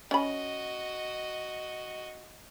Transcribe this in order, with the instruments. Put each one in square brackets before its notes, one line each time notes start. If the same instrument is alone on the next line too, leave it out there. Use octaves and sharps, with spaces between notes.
[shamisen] C#4 B5 [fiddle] F#4 D#5